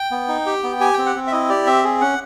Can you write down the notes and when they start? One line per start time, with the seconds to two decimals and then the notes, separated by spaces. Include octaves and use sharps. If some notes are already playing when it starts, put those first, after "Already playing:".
Already playing: G5
0.11 B3
0.28 D#4
0.46 G4
0.63 B3
0.80 G4 G#5
0.94 C4 G5
1.06 F#5
1.15 C4
1.27 E5
1.32 E4 D#5
1.49 G4 D5
1.66 C4 E5
1.84 G#4
2.01 C#4 F#5